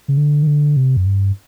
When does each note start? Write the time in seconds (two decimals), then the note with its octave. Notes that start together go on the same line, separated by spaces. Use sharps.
0.08 C#3
0.17 D3
0.43 D#3
0.47 D3
0.77 C3
0.97 F#2
1.06 G2